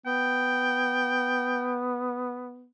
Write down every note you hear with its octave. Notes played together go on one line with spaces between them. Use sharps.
B3 G5